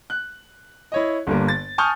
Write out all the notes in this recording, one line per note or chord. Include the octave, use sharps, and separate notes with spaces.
F#6
E4 C#5 D#5
G1 G2 A#3
A6
G#5 A5 C#6 D#6 F6 G6